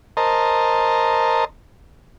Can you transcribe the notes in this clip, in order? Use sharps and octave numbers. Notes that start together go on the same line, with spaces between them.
A#4 C5 D#5 A5